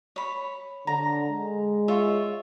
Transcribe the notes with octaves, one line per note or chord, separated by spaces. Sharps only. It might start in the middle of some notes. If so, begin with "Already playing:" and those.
C#5 B5
D3 A#5
G#3
F4 C#5 E5